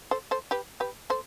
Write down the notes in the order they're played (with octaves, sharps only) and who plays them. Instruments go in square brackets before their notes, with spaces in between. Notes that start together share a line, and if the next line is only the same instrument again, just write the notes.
[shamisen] A4 C5
A4 C5
G4 B4
G4 B4
A4 C5